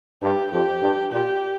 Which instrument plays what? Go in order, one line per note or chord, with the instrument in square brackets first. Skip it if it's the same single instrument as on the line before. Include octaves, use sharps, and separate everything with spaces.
[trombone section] G2 [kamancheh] G4
[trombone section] F2 [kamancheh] G4
[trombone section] G2
[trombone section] A#2 [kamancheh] G4